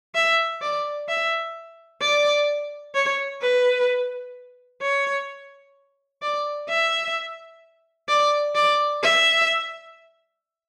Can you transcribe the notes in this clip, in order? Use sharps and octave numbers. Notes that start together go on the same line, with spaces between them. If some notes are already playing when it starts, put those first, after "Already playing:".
E5
D5
E5
D5
C#5
B4
C#5
D5
E5
D5
D5
E5